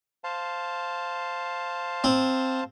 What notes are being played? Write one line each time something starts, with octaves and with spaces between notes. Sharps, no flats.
C5 F5 A5
C4